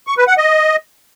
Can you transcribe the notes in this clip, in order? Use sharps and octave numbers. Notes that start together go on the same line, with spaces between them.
C#6
B4
F#5
D#5